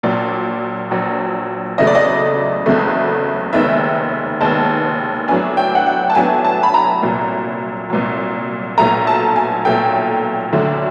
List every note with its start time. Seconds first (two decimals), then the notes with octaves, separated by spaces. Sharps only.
0.03 A#1 A#2 F#3 D5
0.91 A#1 A#2 F#3
1.78 F#1 E2 C#3 F#3 A3 D#5
1.87 D5
1.95 D#5
2.66 F#1 E2 C#3 F#3 A3
3.53 F1 D#2 D#3 G#3 B3 E5
4.40 F1 D#2 D#3 G#3 B3 A5
5.28 A2 F#3 B3 D4 G#5
5.57 G5
5.75 F#5
5.86 G5
6.10 A5
6.15 A2 F#3 B3 D4 G#5
6.45 A5
6.63 B5
6.74 A#5
7.02 C2 A#2 F#3
7.90 C2 A#2 F#3
8.77 B1 A#2 F#3 A3 A#5
9.07 A5
9.36 G#5
9.65 B1 A#2 F#3 A3 G5
10.53 D2 D3 F#3 A3 D4